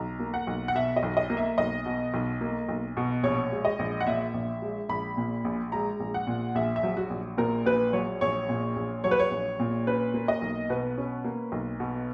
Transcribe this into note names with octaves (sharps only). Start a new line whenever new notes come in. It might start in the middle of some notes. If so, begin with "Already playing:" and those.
Already playing: B1 A#5
A#3
F#5
B1
F#5
B2 E5
D#5
B1
D#5
A#3
E5
B1 D#5
B2
B1
A#3
B1
B2
A#1 C#5
G#3
D#5
A#1
F#5
A#2 E5
A#1
G#3
A#1 B5
A#2
A#1
G#3 A#5
A#1
F#5
A#2
A#1 E5
E5
F#3
F#4
A#1
A#2 A#4
A#1 B4
F#3 C#5
A#1 C#5
A#2
A#1
F#3 C#5
B4
C#5
A#1
A#2
C#4 B4
A#3
D#5
B1
B2 B4
C#4
A#3
B1
B2